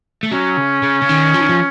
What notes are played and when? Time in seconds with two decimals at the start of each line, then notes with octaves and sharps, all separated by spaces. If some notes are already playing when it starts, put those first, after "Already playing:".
0.23 A3
0.31 F#3 C#4
0.57 C#3
0.83 C#3
1.02 C#3
1.09 D#3
1.34 F3
1.41 D#3
1.49 F3